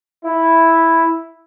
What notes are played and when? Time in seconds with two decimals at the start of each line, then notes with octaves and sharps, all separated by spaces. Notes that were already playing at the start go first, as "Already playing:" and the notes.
0.25 E4